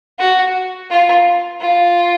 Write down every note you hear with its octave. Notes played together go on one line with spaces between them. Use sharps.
F#4
F4
F4